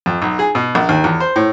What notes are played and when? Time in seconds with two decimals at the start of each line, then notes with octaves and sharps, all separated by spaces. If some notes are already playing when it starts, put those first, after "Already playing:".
0.06 F2
0.22 B1
0.39 G#4
0.55 B2
0.75 A#1
0.89 D#2
1.04 E2
1.20 C5
1.36 A2